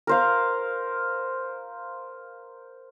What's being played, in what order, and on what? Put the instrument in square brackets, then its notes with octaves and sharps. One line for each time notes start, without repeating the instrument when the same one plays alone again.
[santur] A#4 C5 F5